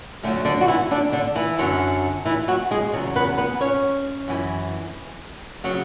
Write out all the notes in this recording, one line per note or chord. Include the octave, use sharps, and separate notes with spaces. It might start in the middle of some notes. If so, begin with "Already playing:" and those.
D2 D3 F#3 A3
D3 D4
F#4
E3 E4
D3 D4
D3 D4
E3 E4
F#2 D3 F#3
E3 E4
F#3 F#4
G#3 G#4
E2 C#3 F#3
B3 B4
B3 B4
C#4 C#5
F#2 E3
C#3 F#3